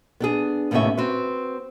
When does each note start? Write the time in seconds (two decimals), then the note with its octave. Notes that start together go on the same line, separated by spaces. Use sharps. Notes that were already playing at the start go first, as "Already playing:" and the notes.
0.20 B3 D4 G#4
0.71 D#2 A2 C3 B3 C#4 E5
0.97 C4 F#4 B4